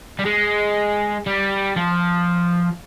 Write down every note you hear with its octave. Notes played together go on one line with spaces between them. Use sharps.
G3
G#3
G3
F3